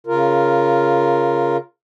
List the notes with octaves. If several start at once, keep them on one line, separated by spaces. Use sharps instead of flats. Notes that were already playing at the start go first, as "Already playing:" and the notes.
C#3 F4 A#4